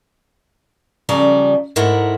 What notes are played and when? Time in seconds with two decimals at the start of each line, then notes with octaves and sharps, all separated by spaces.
1.09 C#3 F3 G3 D5 A#5
1.76 G#2 A3 E4 A#4 F#5